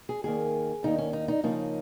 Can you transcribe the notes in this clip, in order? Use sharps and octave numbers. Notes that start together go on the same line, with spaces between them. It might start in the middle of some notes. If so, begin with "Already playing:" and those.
G#4
D#2 D#3 A#3 G#4
D#2 D#3 A#3 D#4
C#4
D#4
D#4
C#3 F3 A#3 C#4 D#4